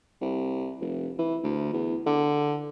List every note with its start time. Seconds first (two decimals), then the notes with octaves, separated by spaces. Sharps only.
0.21 C2
0.81 F1
1.19 E3
1.43 D2
1.73 E2
2.06 D3